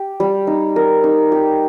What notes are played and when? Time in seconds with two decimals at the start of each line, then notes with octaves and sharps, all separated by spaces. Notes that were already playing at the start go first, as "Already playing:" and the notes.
Already playing: G4
0.20 G3
0.47 D#4
0.76 A#4
1.04 D#4
1.32 G4